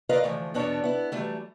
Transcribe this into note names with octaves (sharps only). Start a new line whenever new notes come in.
F4 A#4 B4 D5 D#5 F5
D2 E3 F3 A3
E2 B2 B3 D4 C#5 A5
B3 E4
E3 F#3 G3 A3